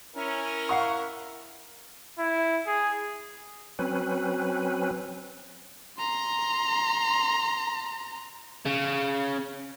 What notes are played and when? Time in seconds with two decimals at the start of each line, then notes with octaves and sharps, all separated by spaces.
0.16 C#4 E4 A#4
0.69 F5 F#5 C#6
2.18 E4
2.66 G#4
3.79 F#3 C4 C#4 B4
5.97 A#5 C6
8.65 C#3